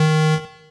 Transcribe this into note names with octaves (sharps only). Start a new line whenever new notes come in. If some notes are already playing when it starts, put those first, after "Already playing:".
Already playing: D#3